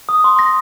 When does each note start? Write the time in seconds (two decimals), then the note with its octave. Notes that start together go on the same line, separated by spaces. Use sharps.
0.09 D#6
0.24 C6
0.39 A#6